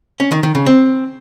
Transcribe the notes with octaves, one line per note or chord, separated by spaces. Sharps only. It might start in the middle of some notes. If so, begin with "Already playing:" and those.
C#4
D#3
D#3
C#3
C4